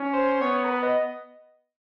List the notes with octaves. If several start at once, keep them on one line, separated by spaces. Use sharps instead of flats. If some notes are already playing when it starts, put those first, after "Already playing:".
Already playing: C#4
C5
B3 C#5
A#4
B4
D#5